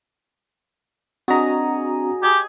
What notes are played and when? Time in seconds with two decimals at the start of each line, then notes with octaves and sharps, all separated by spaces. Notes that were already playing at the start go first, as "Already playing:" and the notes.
1.28 C4 D4 F#4 G#4 C#5 D#5 A#5
2.23 G4 G#4 G#5